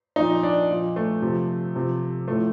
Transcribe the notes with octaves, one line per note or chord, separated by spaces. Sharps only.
A#2 F3 D#4
D4
A#2 F3
A3
C3 F3
C3 F3
A2 F3 A3